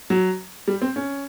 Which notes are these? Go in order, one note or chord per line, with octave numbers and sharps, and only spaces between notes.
F#3
G3
C4
C#4